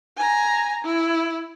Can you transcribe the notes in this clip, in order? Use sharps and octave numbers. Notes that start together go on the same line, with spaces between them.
G#5 A#5
E4